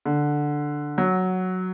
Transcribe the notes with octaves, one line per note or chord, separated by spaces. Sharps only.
D3
F#3